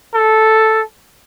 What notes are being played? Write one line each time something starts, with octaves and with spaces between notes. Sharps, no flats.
A4